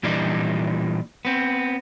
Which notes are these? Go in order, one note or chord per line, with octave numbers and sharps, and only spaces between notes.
A#2 E3 G3 D4 D#4
B3 C4